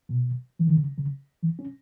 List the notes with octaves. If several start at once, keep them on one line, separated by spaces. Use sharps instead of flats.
B2
E3
D#3
C#3
C#3
E3
C#4